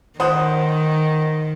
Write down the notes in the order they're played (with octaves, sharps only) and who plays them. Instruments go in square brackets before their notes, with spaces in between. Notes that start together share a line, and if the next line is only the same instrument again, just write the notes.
[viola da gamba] D#3 [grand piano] C5 F#5 D#6